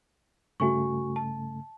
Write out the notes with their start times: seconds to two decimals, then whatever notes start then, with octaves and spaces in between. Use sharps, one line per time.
0.60 G2 C#3 A3 F#4 G#5 C#6
1.16 A5